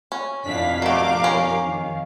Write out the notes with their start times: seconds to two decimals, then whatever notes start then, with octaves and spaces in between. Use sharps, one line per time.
0.12 C#4
0.45 F2 B2 D#3 D4 E4 F5 B6
0.82 F#3 A3 G4 A#4 D6
1.24 C#4
1.65 D#3